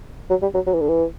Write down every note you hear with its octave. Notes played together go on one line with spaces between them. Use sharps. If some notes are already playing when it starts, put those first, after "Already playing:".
F#3
G3
F#3
F#3
E3
D3
E3